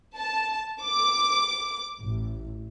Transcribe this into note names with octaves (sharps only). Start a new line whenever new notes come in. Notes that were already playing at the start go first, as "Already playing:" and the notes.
A5
D6
A1